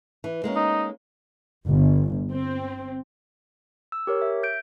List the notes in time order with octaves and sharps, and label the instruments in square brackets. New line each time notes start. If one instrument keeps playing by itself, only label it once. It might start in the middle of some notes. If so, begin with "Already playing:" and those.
[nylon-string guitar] E3
G#3 A#3 C#4
[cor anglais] D#4
[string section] G1
C4
[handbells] E6
G4 A#4 C#5
E5
G6 D7